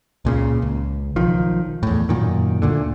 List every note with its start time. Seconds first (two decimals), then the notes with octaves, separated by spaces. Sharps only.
0.25 C#2 A#2 C#3
0.62 C#2
1.16 B1 D#3 F3
1.83 E2 A2
2.09 F#2 A#2 D#3
2.62 D2 A#2 D3